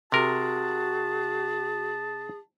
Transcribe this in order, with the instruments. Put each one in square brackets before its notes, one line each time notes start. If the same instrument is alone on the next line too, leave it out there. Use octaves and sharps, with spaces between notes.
[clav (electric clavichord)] C3 A#4 [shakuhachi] F#4 [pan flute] G#4 [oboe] A5